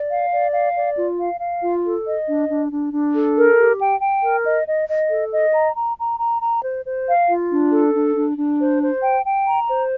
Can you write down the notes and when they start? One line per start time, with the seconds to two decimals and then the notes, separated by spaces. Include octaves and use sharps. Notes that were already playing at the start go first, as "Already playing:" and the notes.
Already playing: D5
0.10 F5
0.32 D5
0.53 F5
0.75 D5
0.97 F4
1.18 F5
1.40 F5
1.62 F4
1.84 A4
2.06 D#5
2.27 D4
2.49 D4
2.71 D4
2.93 D4
3.14 A4
3.36 A#4
3.58 G4
3.80 G5
4.01 G5
4.23 A#4
4.45 D#5
4.66 D#5
4.88 D#5
5.10 A4
5.32 D#5
5.54 A#5
5.76 A#5
5.98 A#5
6.19 A#5
6.41 A#5
6.63 C5
6.85 C5
7.06 F5
7.28 F4
7.50 D4
7.71 A4
7.94 D4
8.15 D4
8.37 D4
8.59 C5
8.81 C5
9.02 G5
9.25 G5
9.46 A#5
9.68 C5